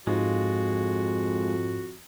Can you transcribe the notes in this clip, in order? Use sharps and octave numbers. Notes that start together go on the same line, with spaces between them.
F2 G#2 G#3 F4 F#4